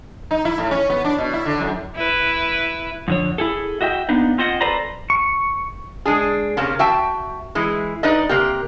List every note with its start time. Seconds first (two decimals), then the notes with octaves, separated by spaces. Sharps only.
0.31 D#4
0.45 E4
0.58 A2
0.71 C#4
0.90 B3
1.04 D4
1.18 B2
1.33 E4
1.46 D3
1.60 F#2
1.95 E4 B4
3.08 F2 D3 C#5
3.38 E4 G#4 A4
3.81 F#4 D#5 E5 G5
4.09 A#3 B3 D4 D#4
4.38 C4 F4 C5 D#5 F#5
4.61 A4 B4 C5 D5 A#5
5.10 C#6
6.05 G#3 D4 G#4
6.57 C3 A#3 C#4
6.79 F#4 E5 G5 A5
7.55 E3 G#3 E4
8.03 D#4 B4 D5 D#5
8.29 C3 A#3 G4